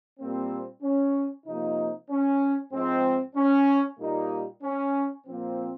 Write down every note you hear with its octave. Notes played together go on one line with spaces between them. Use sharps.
A#2 G3 A#3 C4
C#4
C3 F3 A#3 D#4
C#4
G#2 F3 G#3 C4
C#4
A#2 G3 A#3 D#4
C#4
A#2 F3 A#3 C4